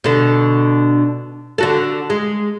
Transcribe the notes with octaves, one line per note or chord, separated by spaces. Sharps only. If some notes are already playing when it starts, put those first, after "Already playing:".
B2 D3
D3 F#4 A4
G#3